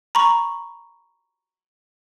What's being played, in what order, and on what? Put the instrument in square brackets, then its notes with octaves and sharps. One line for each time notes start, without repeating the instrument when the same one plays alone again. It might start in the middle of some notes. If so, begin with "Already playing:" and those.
[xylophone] A#5 B5 C#6